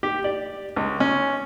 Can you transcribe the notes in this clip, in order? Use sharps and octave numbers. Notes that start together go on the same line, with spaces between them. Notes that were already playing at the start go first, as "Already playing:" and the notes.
G4
D5
C#2
C#4